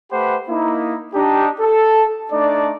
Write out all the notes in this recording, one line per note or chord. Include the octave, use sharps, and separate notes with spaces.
A3 G4 B4 C5 F#5 B5
A#3 D#4 E4
D4 D#4 G4
A4
A3 D4 D#4 D5